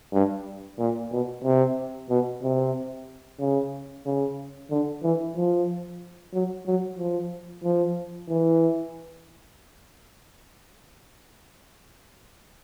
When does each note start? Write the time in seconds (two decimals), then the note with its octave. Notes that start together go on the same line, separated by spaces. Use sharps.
0.13 G2
0.79 A#2
1.12 B2
1.44 C3
2.10 B2
2.43 C3
3.40 C#3
4.06 C#3
4.70 D3
5.03 E3
5.36 F3
6.33 F#3
6.66 F#3
6.98 F3
7.64 F3
8.29 E3